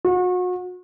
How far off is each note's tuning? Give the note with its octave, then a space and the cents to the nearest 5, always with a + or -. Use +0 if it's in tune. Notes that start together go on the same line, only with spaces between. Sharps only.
F#4 -35